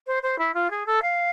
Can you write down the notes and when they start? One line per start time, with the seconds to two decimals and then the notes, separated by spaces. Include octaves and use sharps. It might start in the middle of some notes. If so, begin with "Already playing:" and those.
0.07 C5
0.22 C5
0.38 E4
0.54 F4
0.70 G#4
0.86 A4
1.02 F5